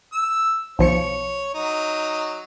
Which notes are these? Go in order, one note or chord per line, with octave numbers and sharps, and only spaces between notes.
E6
B1 F3 C#5 C#7
F#3 D#4